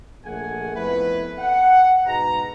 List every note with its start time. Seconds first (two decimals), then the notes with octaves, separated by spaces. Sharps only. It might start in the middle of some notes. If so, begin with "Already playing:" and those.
0.25 A#1 A3 G#4 A#4 F#5 G#5
0.75 F2 A3 B3 E4 B4
1.39 F#5
2.05 G#2 B2 A#5